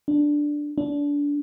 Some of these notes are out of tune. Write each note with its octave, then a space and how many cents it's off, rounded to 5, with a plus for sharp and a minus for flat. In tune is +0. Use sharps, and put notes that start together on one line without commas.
D4 +0
D4 -25